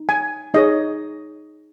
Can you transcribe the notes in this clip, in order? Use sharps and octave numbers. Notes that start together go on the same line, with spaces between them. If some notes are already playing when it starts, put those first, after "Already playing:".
Already playing: D#4
G#5
D#4 G#4 C#5 D#5